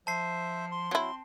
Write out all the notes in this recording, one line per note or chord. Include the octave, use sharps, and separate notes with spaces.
F3 C5 E5 A5 C7
C6
F#3 C4 E4